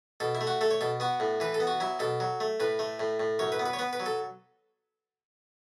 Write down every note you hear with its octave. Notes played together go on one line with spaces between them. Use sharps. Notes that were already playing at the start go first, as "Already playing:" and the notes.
B2 A4
E4
A3
F#4
A3 A4
C#5
B2 A4
B3 F#4
A2
E3 B4
A4
B3
F#4
F#3 E4
B2 A4
F#3
A3
A2 B4
A3
A2
A2
F#2 C#5
B4
B3
B4
C#5
B3 B4
B4
F#3
A4